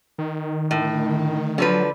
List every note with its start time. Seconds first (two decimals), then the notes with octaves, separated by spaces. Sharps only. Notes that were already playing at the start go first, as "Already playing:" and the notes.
0.18 D#3
0.71 A2 D3 A3
1.58 D3 F3 F#3 B4